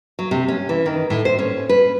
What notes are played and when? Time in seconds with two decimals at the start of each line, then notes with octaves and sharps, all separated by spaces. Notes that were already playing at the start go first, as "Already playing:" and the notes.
0.19 F#3
0.31 C3
0.48 C#4
0.69 E3
0.86 D#3
1.10 A2
1.25 C5
1.39 C#4
1.69 B4